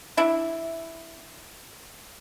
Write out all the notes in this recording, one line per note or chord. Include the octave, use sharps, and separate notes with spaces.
D4 E4